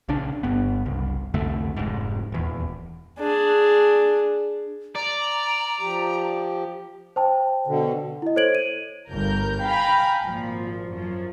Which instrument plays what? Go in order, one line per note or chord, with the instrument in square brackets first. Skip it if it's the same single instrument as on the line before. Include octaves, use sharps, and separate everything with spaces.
[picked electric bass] A#1 C#3 D4
G1 G2 B3
F#1 C2
C2 F2 D3 A3
F1 G#2
D#1 E2
[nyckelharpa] D4 G#4
[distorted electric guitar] D5 [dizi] A#5
[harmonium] F3 G4
[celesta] C5 G5 A5
[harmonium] B2 D3
[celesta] E4 D#5
A4 C5 C#5 G#6 D7 F#7
D#7
[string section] G1 A#4 G6
F5 G5 G#5 A#5 B5
G#1 A#2 F3
F#2 F3